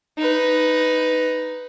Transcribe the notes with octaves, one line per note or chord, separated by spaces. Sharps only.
D#4 B4